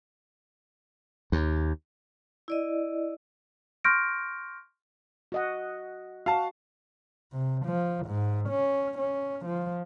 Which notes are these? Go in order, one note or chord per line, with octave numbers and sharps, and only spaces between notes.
D#2
E4 D5 D#5
C6 C#6 F6 G6 A#6 D7
F#4 D#5 F#5
F#4 F5 A5
C3
F3
G#2
C#4
C#4
F3